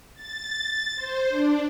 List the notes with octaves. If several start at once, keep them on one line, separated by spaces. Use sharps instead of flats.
A6
A6
C5
D4